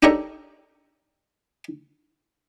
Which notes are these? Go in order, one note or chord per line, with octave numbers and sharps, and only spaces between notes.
D4 D#4 G4 A4 A#4 C#5